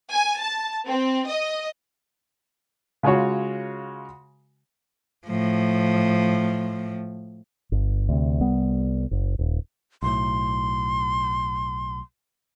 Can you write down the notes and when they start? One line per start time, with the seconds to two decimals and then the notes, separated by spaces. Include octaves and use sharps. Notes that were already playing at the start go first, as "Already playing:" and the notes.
0.11 G#5
0.41 A5
0.86 C4
1.26 D#5
3.03 C#3 G#3 F4 F#4 C#5
5.27 A2 F3
7.72 G1
8.09 D2 C3
8.40 C2 G3 B3
9.11 F#1
9.39 D#1
10.02 B1 A2 C6